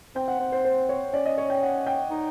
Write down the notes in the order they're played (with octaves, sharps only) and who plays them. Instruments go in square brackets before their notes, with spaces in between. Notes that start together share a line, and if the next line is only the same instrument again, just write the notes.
[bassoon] C4 [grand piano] G5
[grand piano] F#5
[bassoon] C4
[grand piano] C5
C5
C#5
[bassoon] C#4 [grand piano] D5
[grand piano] D#5
C#5
G5
F#5
G5
[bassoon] D#4